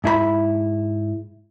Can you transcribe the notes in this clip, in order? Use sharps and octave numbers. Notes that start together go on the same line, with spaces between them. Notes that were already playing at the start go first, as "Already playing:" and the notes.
G#2 E4 G#4 B5